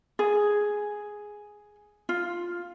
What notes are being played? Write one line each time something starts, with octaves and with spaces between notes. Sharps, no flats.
G#4
F4